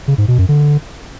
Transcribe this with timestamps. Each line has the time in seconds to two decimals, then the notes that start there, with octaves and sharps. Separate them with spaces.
0.08 C#3
0.18 G#2
0.28 B2
0.38 F#2
0.49 D3